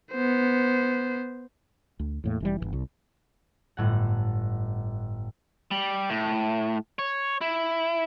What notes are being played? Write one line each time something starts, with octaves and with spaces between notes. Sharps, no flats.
B3 C5
D2
E2 A2 A#3
F1 E3 G3
G1 C#2 E3
C2
G1 A2 F#5
G3
A2
C#5
E4